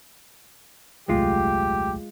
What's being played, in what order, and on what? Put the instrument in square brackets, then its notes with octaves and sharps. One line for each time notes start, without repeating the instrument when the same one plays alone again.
[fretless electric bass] D#1 C2 [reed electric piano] F#2 F#3 A3 [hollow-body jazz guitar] G#3 F4 [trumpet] G4